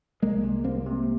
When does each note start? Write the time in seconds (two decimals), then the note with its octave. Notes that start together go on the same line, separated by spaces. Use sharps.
0.22 C2 G#3 A#3
0.43 C3
0.64 C2 A#3 C4
0.86 C3